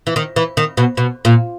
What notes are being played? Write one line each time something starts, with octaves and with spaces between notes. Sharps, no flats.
E3
D#3
E3
D#3
B2
B2
A#2